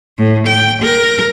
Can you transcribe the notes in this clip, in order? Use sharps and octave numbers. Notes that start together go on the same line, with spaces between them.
A2
G5
A#4